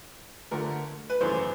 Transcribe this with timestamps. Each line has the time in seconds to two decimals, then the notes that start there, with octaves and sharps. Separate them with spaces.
0.51 D2 D3 F3 A3 A#4
1.10 B4
1.20 G#1 F#2 C#3 E3 A3 C5